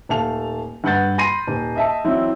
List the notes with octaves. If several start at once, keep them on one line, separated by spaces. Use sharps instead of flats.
D#1 A3 F5 A5 F7
G2 B4 F#5 G6 A6
B5 C6 A#6 C7 D#7
D#1
D#5 E5 A5
E3 F#3 C4 E4